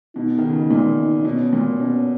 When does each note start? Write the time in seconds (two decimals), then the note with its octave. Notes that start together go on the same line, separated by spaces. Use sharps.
0.15 B2 D#4
0.38 D#3
0.49 C#3
0.59 B2
0.71 A#2
1.25 B2 C#4
1.53 A#2
1.79 B2 C#4